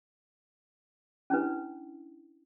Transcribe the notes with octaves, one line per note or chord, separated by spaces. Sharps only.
C#4 D4 E4 B4